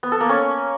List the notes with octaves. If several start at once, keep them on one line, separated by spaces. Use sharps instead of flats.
B3
A4
A#3
C#4